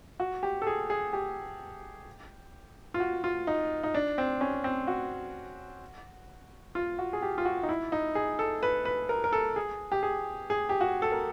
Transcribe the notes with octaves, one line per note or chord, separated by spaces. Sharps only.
F#4
G4
A4
G#4
G#4
G4
F4
F#4
F4
D#4
D#4
D4
C4
C#4
C4
F#4
F4
F#4
G#4
G4
F4
F#4
D#4
E4
D#4
G#4
A4
B4
B4
A#4
A#4
A4
G#4
G4
G#4
G#4
G4
F#4
A4
A#4